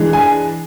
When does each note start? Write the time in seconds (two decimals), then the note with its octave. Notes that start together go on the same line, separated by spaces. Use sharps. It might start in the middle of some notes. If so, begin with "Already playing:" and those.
Already playing: E3 G#3 D4
0.13 G#5